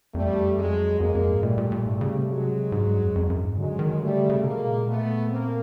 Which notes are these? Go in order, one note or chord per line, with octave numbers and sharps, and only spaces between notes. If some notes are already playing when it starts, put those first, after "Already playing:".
F2 G3 A3
E2
F2
F#2
F2 F#3 G#3
F2 G#3 A#3
F2
G#2
A#2 G3 A3
A#2
A#2
G#2 G3 A3
C#3
C3
F#3 G#3
G#2
G2
F2
F2
F#2
G#2
D3 F#3 G#3
D#3
D3 G3 A3
C#3
C#3
B2 G#3 A#3
A#2
A3 B3
A#3 C4